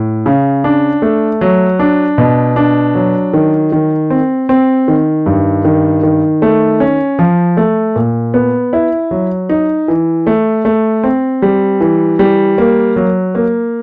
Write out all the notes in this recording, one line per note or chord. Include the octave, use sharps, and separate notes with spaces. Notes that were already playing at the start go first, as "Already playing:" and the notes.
Already playing: A2
C#3
D4
A3
F#3
D4
B2
D4
F#3
D#3
D#3
C4
C4
D#3
G2
D#3
D#3
A3
C#4
F3
A3
A#2
B3
E4
F#3
D#4
E3
A3
A3
C4
G3
E3
G3
A#3
F#3
A#3